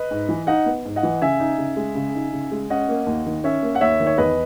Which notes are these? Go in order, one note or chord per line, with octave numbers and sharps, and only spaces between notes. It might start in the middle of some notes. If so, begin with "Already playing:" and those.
Already playing: B4 D#5
G#2
E3
D#4 D#5 F#5
B3
G#2
D#5 F#5
E3
C#3 E5 G#5
D#4
C#3
G#3
C#3
D#4
C#3
G#3
C#4 D#5 F#5
A#3
D#2
D#3
C#4 C#5 E5
A#3
F#5
D#2 C#5 E5
D#3
C#5
E2 B4 D#5